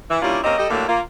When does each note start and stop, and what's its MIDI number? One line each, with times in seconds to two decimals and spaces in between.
0.11 0.18 52
0.22 0.39 55
0.22 0.39 58
0.22 0.39 61
0.22 0.39 62
0.22 0.39 64
0.22 0.39 65
0.44 0.56 58
0.44 0.56 60
0.44 0.56 61
0.44 0.56 67
0.44 0.56 75
0.58 0.68 55
0.58 0.68 67
0.58 0.68 69
0.58 0.68 75
0.70 0.87 45
0.70 0.87 50
0.70 0.87 54
0.70 0.87 55
0.70 0.87 57
0.70 0.87 58
0.88 1.00 58
0.88 1.00 65